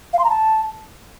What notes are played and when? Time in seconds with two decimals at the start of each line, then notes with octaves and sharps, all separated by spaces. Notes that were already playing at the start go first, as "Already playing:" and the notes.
0.13 F5
0.19 C6
0.24 A#5
0.30 A5